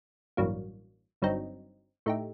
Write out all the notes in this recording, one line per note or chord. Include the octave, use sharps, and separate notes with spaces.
A1 G2 F#3 A#3
G1 G2 F#3 C4 D#4
A2 A3 D#4 G4